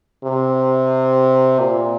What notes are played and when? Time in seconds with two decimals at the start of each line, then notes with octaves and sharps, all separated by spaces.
0.24 C3
1.60 A#2